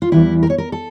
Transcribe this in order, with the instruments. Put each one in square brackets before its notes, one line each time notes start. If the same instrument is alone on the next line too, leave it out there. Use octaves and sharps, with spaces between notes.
[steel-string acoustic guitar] F4
E2 E3 G3 E4
A#4
C#5
A#4
A4